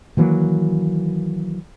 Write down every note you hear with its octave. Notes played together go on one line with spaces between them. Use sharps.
D#3 E3 F#3 A#3